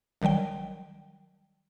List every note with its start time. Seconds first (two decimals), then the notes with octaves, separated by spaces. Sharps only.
0.22 G#1 D#3 F#3 G3 G5